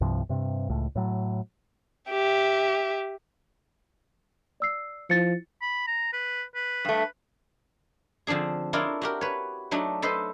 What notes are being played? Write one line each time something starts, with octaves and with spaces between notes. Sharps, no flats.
C2 G2 C3 F3
G2 C3
C#2 A2
A2 F#3
G4 E5
D5 E6 C7
F3 E4 A6 C#7
B5
A#5
B4
B4
G2 A3
D3 F3 C4 D4 G#4
D4 E4 F4 A#4 C#5 D#5
F#4 G4 A#4
B4 C#5
F#3 A3 D4 D#4
A4 B4 C5 D#5